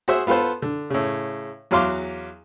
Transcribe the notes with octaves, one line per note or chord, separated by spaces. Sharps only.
F#4 G#4 C5 E5
B3 F4 A4 B4 C5
D3
A2 C#3
E2 F#3 F5 C6 D6